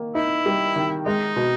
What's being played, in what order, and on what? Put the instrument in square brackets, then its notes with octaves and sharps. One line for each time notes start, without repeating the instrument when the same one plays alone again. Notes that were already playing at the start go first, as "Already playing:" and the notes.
Already playing: [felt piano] D#3 A#3
[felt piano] D#4 [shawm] E4
[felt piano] G3
D#3
[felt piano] G#3 [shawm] D#4
[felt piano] B2